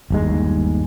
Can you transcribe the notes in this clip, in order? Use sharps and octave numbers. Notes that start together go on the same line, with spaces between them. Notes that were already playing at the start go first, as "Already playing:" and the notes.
G1 D#2 G#3